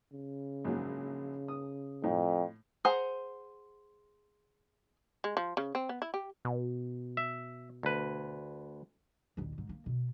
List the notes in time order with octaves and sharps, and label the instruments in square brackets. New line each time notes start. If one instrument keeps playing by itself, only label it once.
[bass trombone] C#3
[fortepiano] A#1 G#2 F#3
D#6
[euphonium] F2 [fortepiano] A2
[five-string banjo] G#4 C5 F#5 A#5
[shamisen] G#3
F3
C#3
C4
B3
E4
G4
[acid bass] B2
[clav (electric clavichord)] E5
D2 B4
[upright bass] A#1 D#2
G#2
A#3
B2